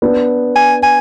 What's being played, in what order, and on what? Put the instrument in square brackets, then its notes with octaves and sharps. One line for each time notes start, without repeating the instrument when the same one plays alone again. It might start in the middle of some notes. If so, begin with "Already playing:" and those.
[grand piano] B3 D4
[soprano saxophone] G#5
G#5